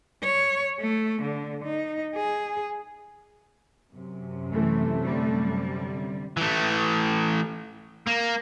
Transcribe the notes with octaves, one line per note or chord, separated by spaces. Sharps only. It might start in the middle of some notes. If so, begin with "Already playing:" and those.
C#5
A3
D3
D#4
G#4
F#2 C3
E3 A3
D3 G3
E3 A3
A#3